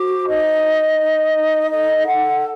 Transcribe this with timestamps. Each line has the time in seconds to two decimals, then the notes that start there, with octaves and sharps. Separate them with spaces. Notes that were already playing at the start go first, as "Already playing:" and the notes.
Already playing: F#4 C5 D6
0.27 D#4 D#5
0.63 D#4
0.99 D#4
1.35 D#4
1.71 A4 D#5
2.06 A4 F#5